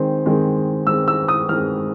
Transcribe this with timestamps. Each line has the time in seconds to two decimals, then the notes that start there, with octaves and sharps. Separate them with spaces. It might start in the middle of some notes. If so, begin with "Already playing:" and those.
Already playing: D#3 G#3 C4
0.26 D#3 G#3 C4
0.87 D#3 G#3 C4 E6
1.08 E6
1.28 D#6
1.49 D#3 G#3 C4 F6